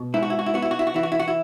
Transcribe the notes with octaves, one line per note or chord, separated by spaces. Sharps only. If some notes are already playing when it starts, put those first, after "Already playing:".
Already playing: B2
G#2 E4
F#4
E4
F#4
E4
B3 F#4
E4
F#4
E4
F#4
E3 E4
F#4
E4
F#4
E4